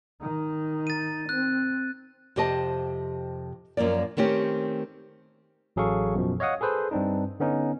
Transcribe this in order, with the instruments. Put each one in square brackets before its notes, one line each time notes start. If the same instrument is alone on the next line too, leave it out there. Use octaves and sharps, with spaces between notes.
[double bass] D#3 D#4
[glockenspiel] A6 D#7
[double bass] C4 [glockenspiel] F#6
[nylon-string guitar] F2 C3 G4 C5 D#5 A5
F#2 F3 A#3 D5
D#3 A3 C4 C#4 G4
[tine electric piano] A1 F#3 G#4 A4 F5 C#6
F#2 B2 F3
C#5 D#5 F5 F#5 D#6
G#4 A4 B4 C5
G2 C4 D4 D#4
D3 B3 C#4 D#4